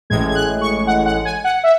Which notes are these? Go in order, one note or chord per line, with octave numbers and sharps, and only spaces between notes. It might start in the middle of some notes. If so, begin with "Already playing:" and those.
A1 A2 G#3 G#6
G#6
F#6
C#6
F#5
F#5
G#5
F#5
E5